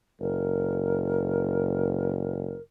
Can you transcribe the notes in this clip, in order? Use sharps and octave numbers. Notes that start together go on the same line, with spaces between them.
F#1 A#4